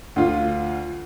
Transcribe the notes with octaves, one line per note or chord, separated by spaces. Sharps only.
D2 F4